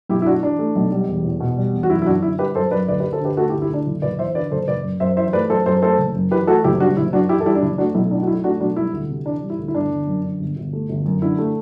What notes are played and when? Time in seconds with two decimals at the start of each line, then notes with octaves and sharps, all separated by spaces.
0.09 B1 E4 G4
0.22 E4
0.26 A2 D4 F#4
0.42 E3 D4
0.59 A3
0.76 B1
0.92 G3
1.08 E1
1.25 E2
1.40 B2
1.57 G3
1.74 E1
1.83 F#4
1.90 F#2 E4
2.02 E4
2.06 F#2 D4 F#4
2.22 D3 E4
2.39 G3 G4 B4
2.55 F#2 A4 C5
2.71 F#2 B4 D5
2.88 D2 B4 D5
3.00 G4 B4
3.04 D2
3.12 A4 C5
3.20 D3 G4 B4
3.37 A3 F#4 A4
3.49 E4 G4
3.53 D2
3.62 E4 G4
3.70 D2 D4
3.86 F#1 E4
4.02 F#1 B4 D5
4.19 E2 C5 E5
4.35 D3 B4 D5
4.51 F#1 A4 C5
4.68 F#1 B4 D5
4.84 F#2
5.00 F#2 C5 E5
5.17 E3 C5 E5
5.27 C5
5.33 A3 B4 D5
5.50 F#2 A4 C5
5.66 F#2 A4 C5
5.82 A3 A4 C5
5.98 F#1
6.15 F#2
6.31 E3 G4 B4
6.47 A3 F#4 A4
6.64 F#1 E4 G4
6.80 G3 D4 F#4
6.97 F#1 E4
7.13 F#2 D4 F#4
7.29 E3 E4 G4
7.40 A4
7.46 G3 E4 G4
7.55 D4
7.62 F#1 E4
7.78 A3 D4 F#4
7.94 B1 E4
8.11 A2 D4
8.22 F#4
8.27 F#3 E4
8.44 A3 D4 F#4
8.60 B1 D4 F#4
8.76 G3 E4
8.93 D2
9.09 C3
9.26 E3 D4
9.42 G3
9.50 E4
9.59 D2
9.68 E4
9.74 G1 D4
9.91 G1
10.07 F#2
10.24 D3
10.40 G1
10.56 G1
10.73 A3
10.89 G1
11.06 F#2
11.22 D3 E4
11.38 A3